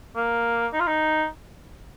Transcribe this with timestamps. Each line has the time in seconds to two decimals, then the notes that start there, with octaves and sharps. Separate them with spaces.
0.16 A#3
0.73 D#4
0.80 F4
0.87 D#4